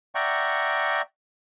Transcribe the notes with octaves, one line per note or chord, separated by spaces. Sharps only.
D5 E5 F#5 G5 A#5 C#6